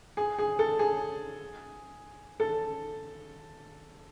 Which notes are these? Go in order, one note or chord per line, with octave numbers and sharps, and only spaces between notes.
G#4
G#4
A4
G#4
A4